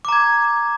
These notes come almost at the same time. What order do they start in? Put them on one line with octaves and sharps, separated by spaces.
D6 A#5 G#6